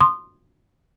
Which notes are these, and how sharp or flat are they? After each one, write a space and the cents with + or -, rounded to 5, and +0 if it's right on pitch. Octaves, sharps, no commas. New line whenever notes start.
C6 +0 D#6 -25